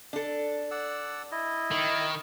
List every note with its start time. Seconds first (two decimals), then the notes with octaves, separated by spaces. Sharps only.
0.13 D4 A4
0.71 D5 F#5 E6
1.32 E4 D#5
1.71 D#3